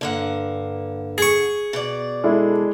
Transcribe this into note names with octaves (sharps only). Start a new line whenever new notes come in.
G2 D3 A#3 F#5
G#4 C#6
B2 D5
G#3 D4 E4 A4